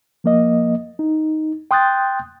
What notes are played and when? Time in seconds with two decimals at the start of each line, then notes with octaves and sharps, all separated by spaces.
0.24 F3 A#3 D#5
0.99 D#4
1.71 G5 C6 D#6 F#6 G6 A6